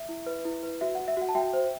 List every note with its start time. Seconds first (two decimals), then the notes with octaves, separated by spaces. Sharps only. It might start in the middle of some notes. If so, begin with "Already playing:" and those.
Already playing: E5
0.09 E4
0.26 B4
0.45 E4
0.63 B4
0.81 F#4 E5
0.95 F#4 F#5
1.08 E5
1.17 F#4 F#5
1.29 A5
1.35 F#4 E5 G5
1.53 C5